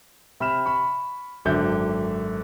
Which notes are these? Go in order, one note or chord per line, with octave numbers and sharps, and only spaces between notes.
C3 B5 F6 E7
B5 C#6
G#1 F#2 D3 E5 G6